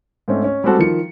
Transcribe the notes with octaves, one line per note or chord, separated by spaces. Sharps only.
G#2 A3 C4 C#4
C#4
G3 G#3 C4 F#4 A4
D#3 F3 C#7